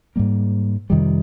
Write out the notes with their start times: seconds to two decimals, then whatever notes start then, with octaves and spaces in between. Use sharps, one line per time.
0.16 G#2 G3 A#3
0.90 F2 C3 D#3 G3